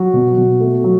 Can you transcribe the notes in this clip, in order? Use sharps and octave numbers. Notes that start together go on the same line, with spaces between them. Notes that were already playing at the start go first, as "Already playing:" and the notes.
Already playing: F#3 F#4
B2
B2
A3
F#3